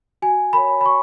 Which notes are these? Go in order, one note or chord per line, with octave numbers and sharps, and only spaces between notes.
F#4 G#5
A#4 C#5 B5
B5
F#4 C#6